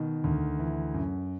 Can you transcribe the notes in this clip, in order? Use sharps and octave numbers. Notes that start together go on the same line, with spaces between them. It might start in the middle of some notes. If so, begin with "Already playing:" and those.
Already playing: B2 D#3
D2
E3
F#2